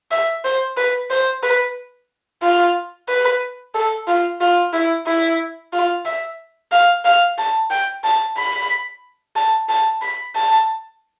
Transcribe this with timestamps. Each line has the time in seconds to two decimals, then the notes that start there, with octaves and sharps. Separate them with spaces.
0.11 E5
0.44 C5
0.77 B4
1.10 C5
1.43 B4
2.42 F4
3.08 B4
3.74 A4
4.08 F4
4.41 F4
4.73 E4
5.06 E4
5.73 F4
6.05 E5
6.72 F5
7.05 F5
7.38 A5
7.70 G5
8.04 A5
8.37 B5
9.36 A5
9.69 A5
10.02 B5
10.35 A5